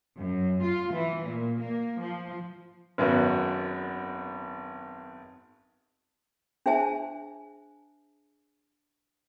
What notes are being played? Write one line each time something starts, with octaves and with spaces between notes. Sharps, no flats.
F#2
F4
E3
A#2
A#3
F3
G#1 F#2 B3 F#4
D4 G#4 C5 E5 G#5 A5